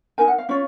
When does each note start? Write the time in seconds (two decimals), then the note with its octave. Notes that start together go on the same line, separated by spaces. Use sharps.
0.18 D#4 A#4 G#5
0.28 F#5
0.38 F5
0.49 C#4 F4 C#5